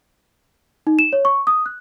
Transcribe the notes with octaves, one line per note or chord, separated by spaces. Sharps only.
D#4
E7
C#5
C#6
D#6
F#6